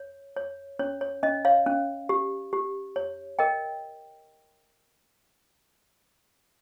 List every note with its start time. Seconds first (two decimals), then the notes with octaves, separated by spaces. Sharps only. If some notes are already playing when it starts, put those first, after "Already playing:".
Already playing: C#5
0.36 C#5
0.79 C#4 C#5
1.01 C#5
1.23 C#4 D#5
1.45 C#5 F5
1.66 C#4
2.09 G4
2.53 G4
2.96 C#5
3.39 A#4 D#5 G5